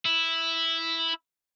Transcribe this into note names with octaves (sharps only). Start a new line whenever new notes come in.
E4